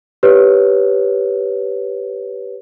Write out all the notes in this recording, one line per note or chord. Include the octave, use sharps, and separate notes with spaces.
G4 B4 C#5